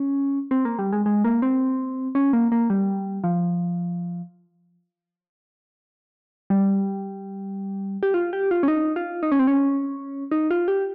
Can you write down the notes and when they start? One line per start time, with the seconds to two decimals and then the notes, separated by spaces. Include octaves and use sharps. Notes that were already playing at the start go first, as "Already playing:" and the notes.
Already playing: C#4
0.51 C4
0.65 A#3
0.79 G3
0.93 G#3
1.06 G#3
1.24 A#3
1.42 C4
2.15 C#4
2.33 A#3
2.52 A#3
2.70 G3
3.24 F3
6.50 G3
8.03 G4
8.14 F4
8.33 G4
8.51 F4
8.63 C#4
8.68 D#4
8.96 F4
9.23 D#4
9.32 C#4
9.39 C4
9.47 C#4
10.31 D#4
10.51 F4
10.68 G4